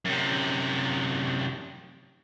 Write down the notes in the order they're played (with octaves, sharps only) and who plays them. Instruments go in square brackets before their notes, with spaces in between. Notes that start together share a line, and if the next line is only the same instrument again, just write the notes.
[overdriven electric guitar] F#2 C3